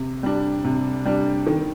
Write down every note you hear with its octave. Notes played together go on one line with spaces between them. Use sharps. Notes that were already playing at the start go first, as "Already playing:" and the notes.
Already playing: C3
G3 D4
C3
G3 D4
D#3